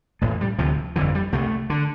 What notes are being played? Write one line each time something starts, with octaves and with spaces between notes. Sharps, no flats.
A1 A2 A3
G3
D2 C3 F3
G1 F2 D3 E3
G3
C2 C3 A3
D3